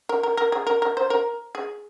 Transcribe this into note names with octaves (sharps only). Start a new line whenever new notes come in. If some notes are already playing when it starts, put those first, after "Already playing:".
A#4
A#4
A#4
G#4
A#4
A#4
C5
A#4
G#4